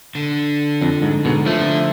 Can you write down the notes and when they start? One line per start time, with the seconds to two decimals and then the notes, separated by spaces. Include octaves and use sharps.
0.15 D3
0.81 F2
1.02 G#2
1.25 G#2 B2
1.46 D3 F3 A3